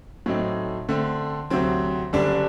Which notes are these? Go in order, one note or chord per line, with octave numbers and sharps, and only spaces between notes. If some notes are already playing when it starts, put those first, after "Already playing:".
A2 F#3 A3 C4 D#4
D3 A3 C4
D2 C3 F#3 C4
F#1 F#2 D3 G3 D4